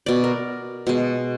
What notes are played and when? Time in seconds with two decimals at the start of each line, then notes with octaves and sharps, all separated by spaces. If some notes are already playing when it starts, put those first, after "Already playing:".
0.06 B2 D5
0.24 A#4
0.87 B2 G#3